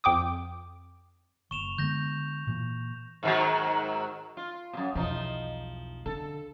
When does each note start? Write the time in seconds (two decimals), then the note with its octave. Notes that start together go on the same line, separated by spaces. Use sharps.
0.04 F2 G5 D6 D#6
1.51 F#1 C#6 E7 F7
1.78 D3 G#3 B3 G6 A#6
2.47 A#2 E3
3.23 G#2 D#3 F#3
4.37 F4
4.73 F#2 B2
4.95 B1 E2 F3 D#4
6.06 D3 A4